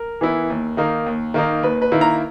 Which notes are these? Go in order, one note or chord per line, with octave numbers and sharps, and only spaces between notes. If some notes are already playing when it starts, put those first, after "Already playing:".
Already playing: A#4
E3 B3 E4
D#2
D#3 A#3 D#4
D#2
D#3 A#3 D#4
D#2 B4
B4
D#3 A#3 E4
A#5